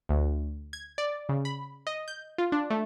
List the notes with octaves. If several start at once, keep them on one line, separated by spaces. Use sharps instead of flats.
D2
G#6
D5
C#3
B5
D#5
G6
F4
D4
A3